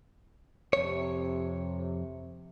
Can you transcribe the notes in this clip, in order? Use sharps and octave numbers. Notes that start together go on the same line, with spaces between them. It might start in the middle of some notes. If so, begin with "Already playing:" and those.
F2 C3 C#5